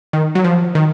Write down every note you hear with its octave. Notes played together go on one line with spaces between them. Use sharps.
D#3
F#3
F3
D#3